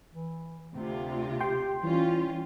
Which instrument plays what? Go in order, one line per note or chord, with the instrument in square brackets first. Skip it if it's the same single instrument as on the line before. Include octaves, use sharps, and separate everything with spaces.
[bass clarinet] E3
[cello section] D2 C3 F4 [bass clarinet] C4
[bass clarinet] G4 [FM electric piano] G5 C6
[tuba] E3 [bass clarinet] G3 [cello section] C#4 F4